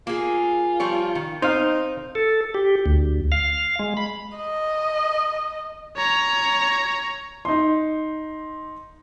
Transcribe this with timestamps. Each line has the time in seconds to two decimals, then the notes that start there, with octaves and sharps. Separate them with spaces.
0.07 A#3 F4 G#4
0.80 F3 G3 C#5
1.15 D#3
1.42 C4 D#4 C5 F5
2.15 A4
2.54 G4
2.86 D2
3.32 F5
3.79 G#3
3.97 B5
4.36 D#5
5.96 C#5 A#5
7.45 D#4 C6